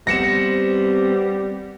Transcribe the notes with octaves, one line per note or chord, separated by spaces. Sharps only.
G3 B3 C4 A#6 C#7 E7